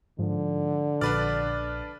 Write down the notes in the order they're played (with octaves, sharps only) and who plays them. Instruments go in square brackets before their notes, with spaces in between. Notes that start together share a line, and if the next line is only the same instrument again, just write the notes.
[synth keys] G#2 F3 [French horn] D3
[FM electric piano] A#1 [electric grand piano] D4 B4 D5 [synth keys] F6 A6